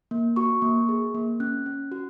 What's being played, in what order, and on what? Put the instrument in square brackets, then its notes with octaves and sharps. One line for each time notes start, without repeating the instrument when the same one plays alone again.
[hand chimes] A#3
F#4 C#6
A#3
G#4
A#3
C#4 F#6
C#4
F#4